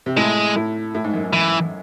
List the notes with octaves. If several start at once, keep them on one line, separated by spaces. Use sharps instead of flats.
C3
A2 G#3
A2
A2
G#2
F#2
G#2
E3